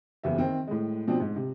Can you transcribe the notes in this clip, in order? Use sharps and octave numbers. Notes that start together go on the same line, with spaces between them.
F#1 E2 E5
D#3 C4
A2 G#3
B2 F3 C4 D4
G#2
C3